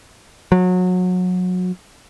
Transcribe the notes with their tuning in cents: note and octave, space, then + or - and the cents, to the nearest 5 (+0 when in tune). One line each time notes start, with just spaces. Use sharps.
F#3 -25